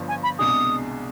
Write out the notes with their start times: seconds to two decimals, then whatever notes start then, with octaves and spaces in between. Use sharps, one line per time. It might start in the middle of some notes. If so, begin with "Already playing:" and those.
Already playing: G1 G2 F3
0.08 G#5
0.23 B5
0.39 C2 B2 G#3 D4 G#4 D#6